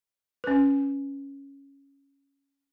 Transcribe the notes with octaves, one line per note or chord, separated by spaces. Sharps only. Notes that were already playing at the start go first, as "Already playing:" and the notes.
C#4 B4